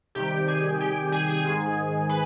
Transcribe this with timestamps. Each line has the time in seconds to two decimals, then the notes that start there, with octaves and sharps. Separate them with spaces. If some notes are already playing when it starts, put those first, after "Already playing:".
0.15 C3 D#3 G3 G4 G5
0.48 G#4 G#5
0.80 G4 G5
1.12 G#4 G#5
1.28 G#4 G#5
1.45 G#2 D#3 G#3
2.09 B4 B5